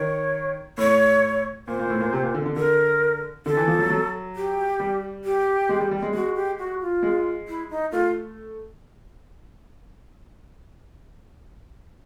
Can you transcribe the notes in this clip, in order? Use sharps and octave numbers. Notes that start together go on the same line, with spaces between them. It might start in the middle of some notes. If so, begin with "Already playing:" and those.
Already playing: D#3 C#5
A2 C#5
A#2 C5
A#2
A2
A#2
C3
A#2
D3
D3
D3 A#4
D3 A4
E3
F3
F#3
F#3
G4
G3
G4
G#3
G3
G3
G#3
G#3 F#4
G4
F#4
F4
G#3
E4
D#4
A3 F4